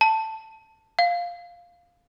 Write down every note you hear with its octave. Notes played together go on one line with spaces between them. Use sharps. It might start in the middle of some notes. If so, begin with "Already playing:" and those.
A5
F5